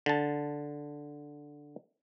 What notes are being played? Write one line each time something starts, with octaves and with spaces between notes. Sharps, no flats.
D3 A5